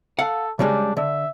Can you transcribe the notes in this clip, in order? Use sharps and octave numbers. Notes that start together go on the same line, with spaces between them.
A4 F5 F#5
C#3 G3 G#3 D4
D3 E5